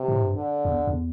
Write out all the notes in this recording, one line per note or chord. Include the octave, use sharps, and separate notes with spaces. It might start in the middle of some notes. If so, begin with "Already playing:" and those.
Already playing: C3
A2
G2
D3
E2
E2